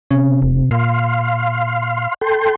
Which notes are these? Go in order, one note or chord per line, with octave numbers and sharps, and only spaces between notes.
C3 C#4
E1
A#2 F5 C6
A4 G5 C6